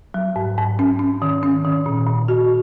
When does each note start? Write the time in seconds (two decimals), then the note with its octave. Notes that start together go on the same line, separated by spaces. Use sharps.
0.14 F#3
0.36 G#2
0.58 G#2
0.79 C#4
0.99 C#4
1.22 D#3
1.43 C#4
1.65 D#3
1.86 A#2
2.07 A#2
2.28 F#4